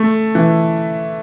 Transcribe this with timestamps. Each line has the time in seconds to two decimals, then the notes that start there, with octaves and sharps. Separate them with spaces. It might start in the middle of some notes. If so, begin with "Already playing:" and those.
Already playing: A3
0.35 E3